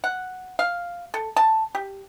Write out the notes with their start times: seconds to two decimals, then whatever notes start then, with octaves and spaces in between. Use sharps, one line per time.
0.04 F#5
0.59 F5
1.14 A4
1.36 A5
1.75 G4